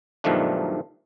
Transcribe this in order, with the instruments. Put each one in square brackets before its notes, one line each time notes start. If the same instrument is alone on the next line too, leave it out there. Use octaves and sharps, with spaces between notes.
[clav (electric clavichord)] B1 G2 D#3 F3 A3 D4